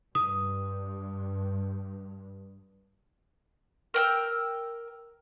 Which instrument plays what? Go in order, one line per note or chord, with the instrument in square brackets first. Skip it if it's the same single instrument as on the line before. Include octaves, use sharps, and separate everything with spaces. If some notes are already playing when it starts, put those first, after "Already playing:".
[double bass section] G2 [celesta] D#6
[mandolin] A#4 G5 E6